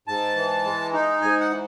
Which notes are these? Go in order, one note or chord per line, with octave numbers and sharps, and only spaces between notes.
G#2 A5
E3
G#3
D#4
G#2 G#5
F#5
E3